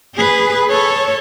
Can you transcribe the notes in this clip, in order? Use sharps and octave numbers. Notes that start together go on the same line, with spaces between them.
G#4 B4
A4 C#5